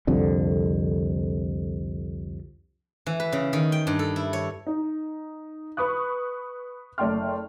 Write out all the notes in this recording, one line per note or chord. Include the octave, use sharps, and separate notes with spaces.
C2 F2 D3
E3
B4
C#3
D#3
G5
G2
A4
E4
C#5
D#4
B4 B5 C#6 D#6 F#6
F#1 A3 D5 G5 C6 F6